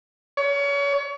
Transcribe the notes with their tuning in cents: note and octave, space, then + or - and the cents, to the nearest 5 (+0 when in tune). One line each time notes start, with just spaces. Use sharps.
C#5 +30